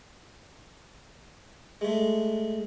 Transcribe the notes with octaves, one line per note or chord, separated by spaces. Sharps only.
G#3 A3